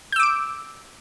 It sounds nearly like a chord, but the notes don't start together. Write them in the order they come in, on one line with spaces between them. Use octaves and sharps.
G6 E6 D6 D7